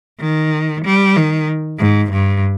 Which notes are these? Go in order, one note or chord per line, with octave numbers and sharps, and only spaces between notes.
D#3
G3
D#3
G#2
G2